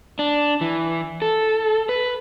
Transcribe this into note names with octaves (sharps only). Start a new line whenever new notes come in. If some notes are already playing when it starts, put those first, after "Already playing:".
D4
E3
A4
B4